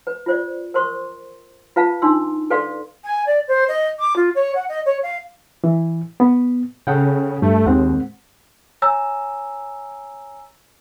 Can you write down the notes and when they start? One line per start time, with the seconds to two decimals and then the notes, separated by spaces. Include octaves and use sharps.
0.07 B4
0.26 F4 C5 D5
0.74 A#4 C5 C6 C#6
1.76 F4 B4 F5 A5
2.02 D4 D#4 C6 E6
2.50 A4 B4 D5 F5 G5 C6
3.04 G#5
3.27 D5
3.48 C5
3.68 D#5
3.99 D6
4.16 F4
4.35 C#5
4.55 F#5
4.69 D#5
4.86 C#5
5.03 F5
5.64 E3
6.20 B3
6.87 C#3 A4 F#5 G5
7.42 G2 A3
7.66 D#2 G#3 C4 F#5
8.82 C#5 G#5 A#5 E6